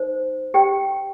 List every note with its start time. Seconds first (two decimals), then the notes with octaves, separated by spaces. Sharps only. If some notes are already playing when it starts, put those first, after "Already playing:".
Already playing: D#4 C5
0.54 G4 G5